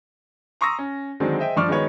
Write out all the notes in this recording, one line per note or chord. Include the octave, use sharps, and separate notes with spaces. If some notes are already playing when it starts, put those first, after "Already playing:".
A#5 C6 C#6 D#6 E6 A#6
C#4
D3 D#3 F#3 G#3 C4 D4
G#4 C5 D#5 E5 G5
G2 F3 D5 C#6 D6 F6
D#3 G#3 B3 F#4 B4 C#5